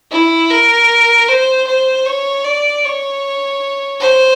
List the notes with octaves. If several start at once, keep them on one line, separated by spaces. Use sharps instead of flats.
E4
A#4
C5
C5
C#5
D5
C#5
C5